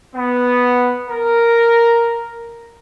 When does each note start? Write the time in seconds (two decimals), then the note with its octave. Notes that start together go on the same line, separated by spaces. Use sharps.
0.15 B3
1.09 A#4